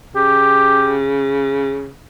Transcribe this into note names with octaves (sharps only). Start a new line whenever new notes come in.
C#3 G4